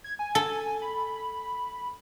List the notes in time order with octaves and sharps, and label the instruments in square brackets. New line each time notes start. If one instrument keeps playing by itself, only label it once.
[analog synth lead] G#6
G#5
[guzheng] A4
[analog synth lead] B5